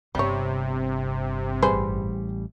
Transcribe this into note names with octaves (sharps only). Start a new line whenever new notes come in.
G1 G2 C3 G3 C#5
A1 G3 G#4 B4 C5